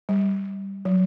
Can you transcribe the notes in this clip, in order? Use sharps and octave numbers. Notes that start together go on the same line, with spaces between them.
G3
F#3